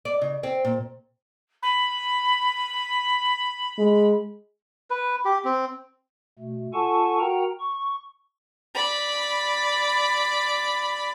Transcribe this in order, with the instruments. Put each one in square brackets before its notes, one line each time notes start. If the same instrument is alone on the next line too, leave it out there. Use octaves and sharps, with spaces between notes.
[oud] D5
C#3
C4
A#2
[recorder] B5
[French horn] G#3
[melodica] B4
G4
C4
[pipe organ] B2 A3
F4 A4 F#5 G#5 A5 C#6
F#4 A#4 F#5 G5 A#5
C#6
[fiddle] D5 B5